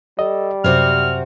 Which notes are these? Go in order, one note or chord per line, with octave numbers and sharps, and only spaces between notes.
G3 A4 D#5
F#2 C3 C4 F#4 F6